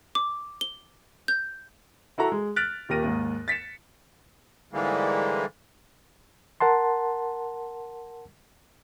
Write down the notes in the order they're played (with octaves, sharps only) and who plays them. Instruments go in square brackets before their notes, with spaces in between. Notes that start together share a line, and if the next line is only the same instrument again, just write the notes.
[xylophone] D6
G7
G6
[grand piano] E4 F#4 A4 A#5
G#3
F6 F#6 A6 B6 D7
D#1 D#2 G4 A#4 A#6 D#7
D#2 G#2
A6 B6 C#7 E7
[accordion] G#2 D3 E3 G3 G#3 A#3
[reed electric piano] A#4 F#5 A5 C6